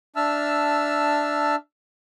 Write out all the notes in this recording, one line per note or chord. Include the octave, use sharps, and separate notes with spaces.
D4 E5 A5 E6 F6